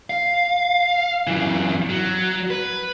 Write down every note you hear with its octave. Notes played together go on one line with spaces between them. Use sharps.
F5
F#2 E3
F#3
B4